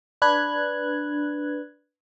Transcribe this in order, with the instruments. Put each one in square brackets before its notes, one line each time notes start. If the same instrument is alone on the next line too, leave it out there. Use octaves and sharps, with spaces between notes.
[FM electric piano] D4 B4 F#6 G#6